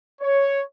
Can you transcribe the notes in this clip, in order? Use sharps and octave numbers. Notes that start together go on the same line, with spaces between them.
C#5